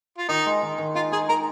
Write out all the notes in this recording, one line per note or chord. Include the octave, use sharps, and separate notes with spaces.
F4
D#3 D#4
G#3
D#3
D#3
D#4 F4
D#4 G#4
D#4 A#4